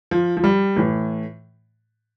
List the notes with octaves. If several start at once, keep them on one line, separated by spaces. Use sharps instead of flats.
F3
F3
G3
A2 E3